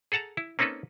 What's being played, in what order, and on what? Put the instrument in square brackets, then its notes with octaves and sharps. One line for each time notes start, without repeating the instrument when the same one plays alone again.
[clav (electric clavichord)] G#4 A4 F#5 A5 A#5
E4
A#3 C4 C#4 D#4 A4 B4